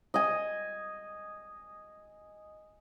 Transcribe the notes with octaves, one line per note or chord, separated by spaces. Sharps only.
D#5 G#5